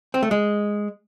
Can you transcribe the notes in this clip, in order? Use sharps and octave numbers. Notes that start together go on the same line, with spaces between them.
C4
A3
G#3